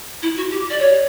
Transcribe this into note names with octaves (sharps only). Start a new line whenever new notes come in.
E4
F#4
G4
D5
C#5